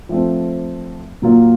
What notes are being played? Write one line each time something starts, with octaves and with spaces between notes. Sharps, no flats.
F3 A3 C4
A#2 F#3 A#3 F4